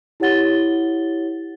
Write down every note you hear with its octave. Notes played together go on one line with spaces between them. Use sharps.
E4 G4 C#5 F#5 A6 G7